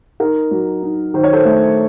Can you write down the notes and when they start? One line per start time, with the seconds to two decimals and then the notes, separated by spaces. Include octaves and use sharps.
0.20 D#4 A#4
0.51 F#3
0.83 D#4
1.14 D#3 C5
1.23 C#5
1.33 A4 C5
1.45 A3